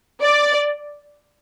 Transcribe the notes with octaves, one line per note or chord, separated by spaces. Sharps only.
D5